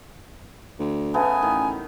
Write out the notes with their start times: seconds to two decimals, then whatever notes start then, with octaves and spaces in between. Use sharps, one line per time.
0.79 D2
1.14 C#3 A3 B3 G#5
1.43 A1 D#3